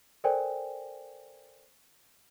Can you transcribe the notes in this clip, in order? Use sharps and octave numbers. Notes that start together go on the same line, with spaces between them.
A4 A#4 C5 D5 G5 G#5